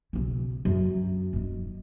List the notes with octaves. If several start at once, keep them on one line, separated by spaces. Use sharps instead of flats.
B1 C#3
F#2
D#1 D#3